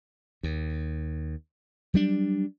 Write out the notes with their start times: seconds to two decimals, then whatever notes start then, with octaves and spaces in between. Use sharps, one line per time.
0.43 D#2
1.94 F#3 G3 D4